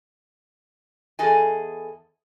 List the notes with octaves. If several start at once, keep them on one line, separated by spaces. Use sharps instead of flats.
E2 G#4 A4 D#5 G#5